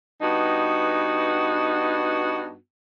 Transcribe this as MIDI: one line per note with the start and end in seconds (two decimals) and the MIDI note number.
0.21 2.54 43
0.21 2.54 59
0.21 2.54 63
0.21 2.54 66